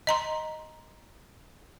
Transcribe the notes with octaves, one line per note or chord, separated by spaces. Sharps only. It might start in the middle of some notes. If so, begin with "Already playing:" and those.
D#5 A#5 C6